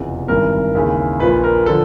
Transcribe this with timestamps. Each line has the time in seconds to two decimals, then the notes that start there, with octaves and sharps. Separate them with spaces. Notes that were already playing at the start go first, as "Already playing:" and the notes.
Already playing: F1 E2 C#3
0.28 G#1 G2 E3 A#4
0.75 D#2 C#3 E3
1.20 A#1 A#2 F3 B4
1.44 A#4
1.66 D3 F3 A4